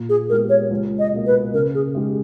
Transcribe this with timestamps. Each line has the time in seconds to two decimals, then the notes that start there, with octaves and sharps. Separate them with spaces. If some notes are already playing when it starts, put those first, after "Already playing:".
Already playing: A#2
0.09 G#4
0.30 G#3 B3 G4 A#4
0.49 C#5
0.70 C#2
0.99 D#5
1.12 B2 A#3
1.27 B4
1.53 C#3 A#4
1.75 G#4
1.95 G#3 D#4 G4